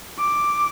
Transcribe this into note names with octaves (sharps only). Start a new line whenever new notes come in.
D6